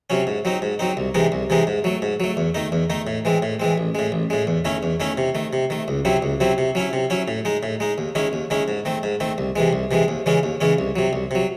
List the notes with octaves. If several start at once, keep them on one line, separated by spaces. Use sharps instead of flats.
C3 F#3 C#4
G#2
F#3 C4 D#4
G#2
F#3 C4 D#4
C2
C3 E3 G#3 D#4
C2
C3 E3 G#3 D#4
G#2
F#3 A3
G#2
F#3 A3
E2
D#3 A3 D#4
E2
D#3 A3 D#4
A2
E3 G#3 C4
A2
E3 G#3 C4
A1
A2 G#3
A1
A2 G#3
E2
D#3 A3 C#4 E4
E2
D#3 A3 C#4 E4
C3
D#3 A3
C3
D#3 A3
C#2
C3 F#3 C4 E4
C#2
C3 F#3 C4 E4
C3
F#3 C#4 E4
C3
F#3 C#4 E4
A2
G#3 D#4
A2
G#3 D#4
D#2
D#3 G#3 C#4 E4
D#2
D#3 G#3 C#4 E4
G#2
D#3 A3 C4
G#2
D#3 A3 C4
C2
C3 E3 G#3
C2
C3 E3 G#3
D#2
C#3 E3 G#3 C#4
D#2
C#3 E3 G#3 C#4
C2
C3 F#3
C2
C3 F#3